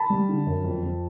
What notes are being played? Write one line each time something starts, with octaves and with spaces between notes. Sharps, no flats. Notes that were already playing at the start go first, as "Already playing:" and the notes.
Already playing: A5 B5
G3
D3
F#2
F2
F2